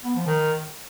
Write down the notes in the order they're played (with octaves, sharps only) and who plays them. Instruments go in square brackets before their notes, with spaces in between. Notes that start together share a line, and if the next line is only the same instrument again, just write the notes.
[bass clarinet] B3
F3
D#3